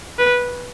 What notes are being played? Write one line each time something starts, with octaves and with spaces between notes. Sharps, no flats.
B4